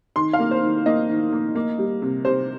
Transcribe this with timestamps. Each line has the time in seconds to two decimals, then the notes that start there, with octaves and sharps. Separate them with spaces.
0.16 D#3 C6
0.33 F5
0.40 A#3
0.51 C5
0.63 D#3
0.86 A#3 D#5
1.09 D#3
1.32 A#3
1.55 A#3
1.79 G3
2.02 C3
2.25 C3 C5